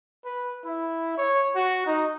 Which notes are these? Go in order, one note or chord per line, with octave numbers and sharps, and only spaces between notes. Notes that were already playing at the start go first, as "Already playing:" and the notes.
B4
E4
C#5
F#4
D#4